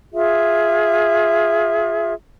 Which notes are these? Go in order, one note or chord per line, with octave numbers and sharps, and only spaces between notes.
F4 G#4 E5